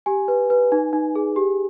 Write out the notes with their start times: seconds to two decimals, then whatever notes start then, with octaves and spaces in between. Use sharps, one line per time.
0.06 G4 G#5
0.28 B4
0.50 B4
0.72 D#4
0.93 D#4
1.16 G#4
1.36 G4